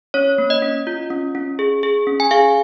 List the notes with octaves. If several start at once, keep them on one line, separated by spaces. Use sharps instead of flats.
C#4 C#5
A#3
D#5
C#4
F4
C#4
C#4
G#4
G#4
C#4
G#5
G#4 F5